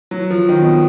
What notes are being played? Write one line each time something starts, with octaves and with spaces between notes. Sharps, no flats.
F#3
F3
D#3
B2